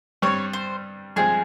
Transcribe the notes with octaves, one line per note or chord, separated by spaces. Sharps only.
G2 G3 C4 C#5
C5
G2 F3 G#3 C4 G#4